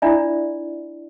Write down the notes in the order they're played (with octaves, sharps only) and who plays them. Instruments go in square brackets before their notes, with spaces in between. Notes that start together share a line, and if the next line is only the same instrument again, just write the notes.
[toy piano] D4 E4 F4 D5 E5